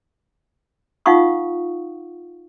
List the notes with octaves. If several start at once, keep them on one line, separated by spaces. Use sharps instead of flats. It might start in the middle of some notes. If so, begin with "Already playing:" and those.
D#4 F4 F5 F#5 C#6 D#6